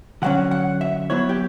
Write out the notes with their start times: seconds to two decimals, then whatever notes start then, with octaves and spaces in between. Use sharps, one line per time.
0.22 D3 F#3 C#4 F#5
0.51 F#5
0.81 E5
1.10 F#3 B3 E4 C#5
1.29 G4